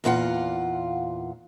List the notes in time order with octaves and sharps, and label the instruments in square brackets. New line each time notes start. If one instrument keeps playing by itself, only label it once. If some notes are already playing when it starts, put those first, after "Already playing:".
[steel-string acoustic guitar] E2 A#2 F4 F#5